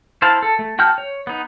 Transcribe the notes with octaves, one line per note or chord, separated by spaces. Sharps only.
E4 C5 F5 A5
A4
A3
F#4 G5 A5 F6 G6
C#5
B3 D#4